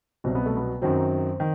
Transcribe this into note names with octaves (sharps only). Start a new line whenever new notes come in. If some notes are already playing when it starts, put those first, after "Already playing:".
C2 B2 F#3 C4
B3
A3
B3
F#2 D#3 F#3 C4
D#3